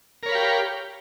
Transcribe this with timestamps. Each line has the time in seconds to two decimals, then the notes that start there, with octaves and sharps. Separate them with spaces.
0.23 A#4
0.26 C#5
0.29 B5
0.32 F5
0.35 G4